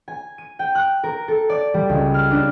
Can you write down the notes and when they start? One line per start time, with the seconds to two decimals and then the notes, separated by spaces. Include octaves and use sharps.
0.08 G#5
0.38 D#7
0.59 G5
0.75 F#6
1.03 A#4
1.28 A4
1.49 D5
1.74 G3
1.89 C#2
2.14 F6
2.31 D4